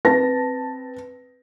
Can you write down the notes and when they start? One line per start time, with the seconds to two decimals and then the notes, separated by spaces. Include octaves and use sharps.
0.05 C4 B4 A5 A#6